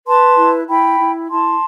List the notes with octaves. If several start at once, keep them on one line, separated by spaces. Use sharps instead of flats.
B4 A5 C6
E4
E4 G5 B5
E4
E4 A5 C6